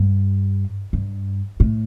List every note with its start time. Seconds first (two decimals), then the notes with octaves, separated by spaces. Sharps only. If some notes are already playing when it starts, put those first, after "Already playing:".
Already playing: G2
0.93 G2
1.60 A2